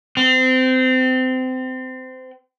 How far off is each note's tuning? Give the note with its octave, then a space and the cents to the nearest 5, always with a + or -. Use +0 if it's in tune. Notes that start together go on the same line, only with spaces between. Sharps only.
C4 -25